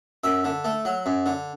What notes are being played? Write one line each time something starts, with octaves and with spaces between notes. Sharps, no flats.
F#2 E5
D3
A3
F#3
F#2
D3